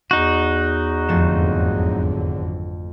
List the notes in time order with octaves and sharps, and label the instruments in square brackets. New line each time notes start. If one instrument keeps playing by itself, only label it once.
[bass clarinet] E2 [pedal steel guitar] D#4 F#4
[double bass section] G#1 D3 F#3 [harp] F2 A3 E7